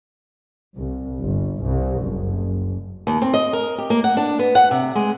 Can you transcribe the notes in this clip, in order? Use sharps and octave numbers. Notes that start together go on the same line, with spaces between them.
C2
G1
C2
F#1
D#2
C4
D#5
A#4
G4
A#3
F#5
D4
B3
F#5
C3
G#3